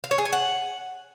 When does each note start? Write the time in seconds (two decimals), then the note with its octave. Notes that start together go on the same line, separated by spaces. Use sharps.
0.04 F5
0.11 C#5
0.18 G#4
0.25 G#5
0.33 F#5